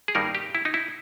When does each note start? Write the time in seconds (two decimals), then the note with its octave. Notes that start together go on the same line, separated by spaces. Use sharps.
0.08 G#4
0.15 G2 D#3 G3 A#3 D#4 A#4
0.35 G4
0.55 E4
0.65 D#4
0.74 E4